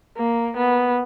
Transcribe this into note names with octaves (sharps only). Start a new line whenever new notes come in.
A#3
B3